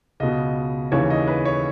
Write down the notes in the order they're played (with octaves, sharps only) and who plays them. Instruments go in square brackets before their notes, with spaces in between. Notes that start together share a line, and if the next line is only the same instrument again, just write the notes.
[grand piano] C#2 B2 D#5
D#2 C#3 E3 C#5
D#5
B4
C#5